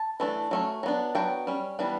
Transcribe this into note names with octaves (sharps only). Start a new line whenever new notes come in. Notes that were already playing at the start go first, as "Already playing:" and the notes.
Already playing: A5
E3 A3 D4
F#3 A3 C#4
F#3 B3 D4
F#3 B3 D4 G5
G3 C#4
E3 G3 B3 D4